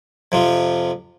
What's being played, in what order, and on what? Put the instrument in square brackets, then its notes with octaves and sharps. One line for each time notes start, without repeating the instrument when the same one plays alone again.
[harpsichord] F2 C3 F3